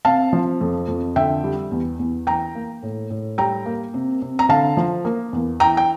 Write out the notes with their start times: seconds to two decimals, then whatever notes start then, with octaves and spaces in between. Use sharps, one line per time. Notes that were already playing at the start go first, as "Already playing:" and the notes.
0.05 C3 F5 A5
0.33 F3
0.61 F2
0.88 F2
1.16 D3 E5 G5
1.44 G3
1.71 E2
1.99 E2
2.27 E3 G5 A#5
2.55 A#3
2.83 A2
3.10 A2
3.38 G3 G5 A#5
3.66 A#3
3.94 C3
4.22 C3
4.39 A#5
4.49 D3 F5 A5
4.77 F3
5.05 A#3
5.33 E2
5.60 E3 G5 A#5
5.77 G5